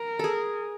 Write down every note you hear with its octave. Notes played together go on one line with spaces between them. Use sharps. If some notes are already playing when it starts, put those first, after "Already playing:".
Already playing: A#4
G#4 A4